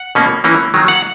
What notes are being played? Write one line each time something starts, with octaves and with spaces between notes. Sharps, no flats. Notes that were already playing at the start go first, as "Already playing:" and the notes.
Already playing: F#5
B2 A#3 C#4
E3 A#3 C#4
D#3 F#3 A#3
F#5